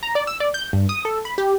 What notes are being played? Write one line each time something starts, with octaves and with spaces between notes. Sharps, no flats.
A#5
D5
E6
D5
G6
G2
D#6
A4
B5
G4